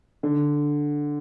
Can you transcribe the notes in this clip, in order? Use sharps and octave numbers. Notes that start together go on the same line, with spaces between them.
D3